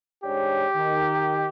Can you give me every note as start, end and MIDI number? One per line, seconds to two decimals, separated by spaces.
0.24 0.65 44
0.24 0.65 62
0.24 1.48 67
0.24 0.65 73
0.75 1.46 51